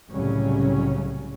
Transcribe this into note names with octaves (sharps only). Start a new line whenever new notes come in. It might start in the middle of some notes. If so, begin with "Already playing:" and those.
C2 A2 C#3 F#3 G3 C#4